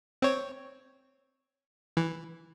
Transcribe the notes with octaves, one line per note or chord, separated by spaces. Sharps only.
C4 C#5
E3